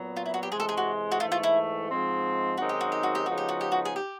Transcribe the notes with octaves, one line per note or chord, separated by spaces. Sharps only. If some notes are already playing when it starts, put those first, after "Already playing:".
Already playing: A#2 F#3 B3
F4
E4
F#4
G4
C3 E3 G#3 G#4
A4
G#4
F#4
F#4
G#2 E3 A3 F4
F4
E4
G#2 F3 G#3 C4
F#2 D#3 G#3 C4 D#4 F#4
G4
F#4
G4
F#4
G4
C#3 F3 G#3 B3 D#4 F#4
G4
F#4
G4
F#4
G#4
G4